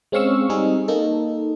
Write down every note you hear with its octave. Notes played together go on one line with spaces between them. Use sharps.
G#3 C4 C#4 F5 C#6 E6
G3 C4 D#4 G#4
A#3 D#4 A4